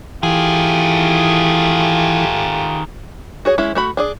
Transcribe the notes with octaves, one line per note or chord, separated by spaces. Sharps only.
D#3 E3 A3 F4 G4 G#4
F#4 G#4 C#5
G#3 C#4 E4
A3 F#4 B5
D4 G#4 D5